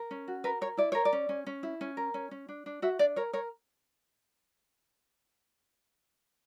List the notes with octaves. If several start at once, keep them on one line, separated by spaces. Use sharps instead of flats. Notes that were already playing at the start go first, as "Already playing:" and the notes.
Already playing: A#4
C#4
F#4
A#4 B4
A#4 C#5
E4 D5
A#4 C#5
D5
C#4
C#4
C#4
E4
C#4
A#4
C#4
C#4
D4
D4
F#4 E5
D4 D5
A#4 C#5
A#4 C#5